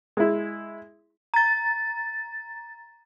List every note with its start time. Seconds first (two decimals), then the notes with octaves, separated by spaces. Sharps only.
0.17 G#3 E4
1.34 A#5 A6